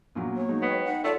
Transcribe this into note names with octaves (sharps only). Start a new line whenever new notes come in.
A#1 A#2 F#3 A#3 B3
C#5
F#3 G#3 D#4
B3 D#5 G5
D#4 F#5
A3 F4 A4 C#5 D5